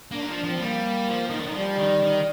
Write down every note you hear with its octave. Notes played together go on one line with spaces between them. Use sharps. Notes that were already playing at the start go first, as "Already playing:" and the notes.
A#3 D4
D#3
F3
D4
F3 C4
G3 A#3
F3
D#3
D3
D#3
F3 G3
D#3
D#3